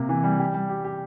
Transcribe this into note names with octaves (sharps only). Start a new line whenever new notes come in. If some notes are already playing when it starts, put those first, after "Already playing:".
Already playing: C3 A#3
E3
G3
G4
G3
G4
G4